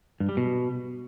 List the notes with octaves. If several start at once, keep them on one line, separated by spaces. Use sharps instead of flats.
G2
G3
B2